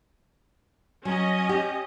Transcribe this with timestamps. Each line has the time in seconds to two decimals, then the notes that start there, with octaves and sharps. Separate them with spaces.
1.05 F#3 C#4 D#5 G#5
1.49 G4